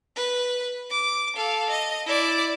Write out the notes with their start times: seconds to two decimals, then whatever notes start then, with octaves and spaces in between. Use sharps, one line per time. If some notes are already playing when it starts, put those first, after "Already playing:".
0.16 B4
0.90 D6
1.35 A4 F5
1.70 D#5
2.06 E4 D5